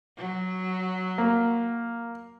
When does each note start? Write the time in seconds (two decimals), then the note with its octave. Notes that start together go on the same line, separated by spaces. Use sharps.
0.17 F#3
1.18 A#3